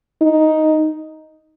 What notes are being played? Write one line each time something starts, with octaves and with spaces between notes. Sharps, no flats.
D#4